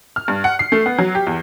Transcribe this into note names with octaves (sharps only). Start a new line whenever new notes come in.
F6
G2
F#5
C7
A3
B3
F#3
G4
E2